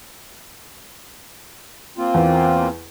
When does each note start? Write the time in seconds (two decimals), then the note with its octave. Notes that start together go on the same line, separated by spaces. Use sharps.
1.98 A#3 C4 F4
2.14 E2